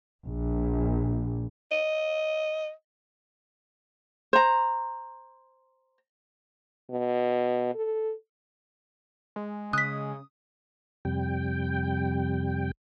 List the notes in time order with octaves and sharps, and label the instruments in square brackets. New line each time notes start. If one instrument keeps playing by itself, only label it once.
[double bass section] A#1
[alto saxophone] D#5
[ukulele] C5 A#5
[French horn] B2
A4
[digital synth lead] G#3
[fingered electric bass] C#3 [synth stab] D#6 [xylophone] F#6 B6
[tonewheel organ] F2 C3 G3 G5